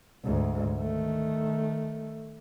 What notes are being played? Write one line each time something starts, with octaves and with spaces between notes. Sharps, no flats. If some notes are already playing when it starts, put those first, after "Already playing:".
D2 G#2
D#3 A3